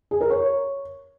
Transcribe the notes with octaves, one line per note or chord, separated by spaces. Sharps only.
G#4
A#4
C#5